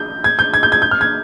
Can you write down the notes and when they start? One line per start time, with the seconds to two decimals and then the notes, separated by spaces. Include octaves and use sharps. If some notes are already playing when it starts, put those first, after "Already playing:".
Already playing: G6
0.24 G#6
0.39 G6
0.54 G#6
0.63 G6
0.72 G#6
0.82 G6
0.91 F6
1.01 G#6